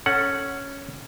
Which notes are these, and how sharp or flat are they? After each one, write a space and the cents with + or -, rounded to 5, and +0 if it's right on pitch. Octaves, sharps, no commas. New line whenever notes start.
C#4 +0 A4 +0 F#5 +0